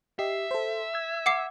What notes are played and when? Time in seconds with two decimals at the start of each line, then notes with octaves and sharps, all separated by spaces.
0.19 G4 D#5 E5 C7
0.51 A4 C5
0.94 E6 G#6
1.26 F#5 D6 C7